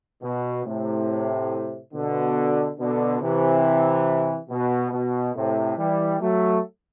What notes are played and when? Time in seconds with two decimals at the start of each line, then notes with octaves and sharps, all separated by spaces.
0.23 B2
0.65 A2 C3
1.93 B2 D3
2.78 B2 D3
3.21 C3 E3
4.49 B2
4.92 B2
5.35 A2 C3
5.78 E3 G3
6.21 F#3 A3